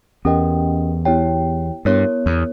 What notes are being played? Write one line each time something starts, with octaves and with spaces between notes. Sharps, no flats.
E2 C#4 G4 A#4 D#5 G5
B3 E4 G4 C#5 G5
G2 B3 E4 A#4 C#5
E2